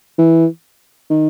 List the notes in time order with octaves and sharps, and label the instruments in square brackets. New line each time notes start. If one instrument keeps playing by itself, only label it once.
[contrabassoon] E3
D#3